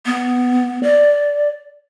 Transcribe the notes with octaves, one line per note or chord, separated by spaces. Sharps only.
B3
D5